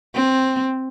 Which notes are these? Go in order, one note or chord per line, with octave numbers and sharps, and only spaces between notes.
C4